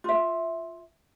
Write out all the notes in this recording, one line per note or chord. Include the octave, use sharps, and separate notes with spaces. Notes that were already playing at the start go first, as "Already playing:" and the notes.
F4 E5